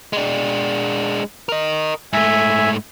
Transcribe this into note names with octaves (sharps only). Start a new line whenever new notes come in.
G#3 D4
A#4 D#5
G#2 A3 E5 G#5